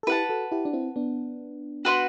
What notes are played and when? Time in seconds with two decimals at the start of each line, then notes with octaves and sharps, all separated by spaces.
0.03 A4
0.07 E4 G4 B4 F#5 A5
0.29 F#4 A4
0.52 E4 G4
0.65 D4
0.73 C4 E4
0.96 B3 D4
1.85 F#4 B4 F#5 C6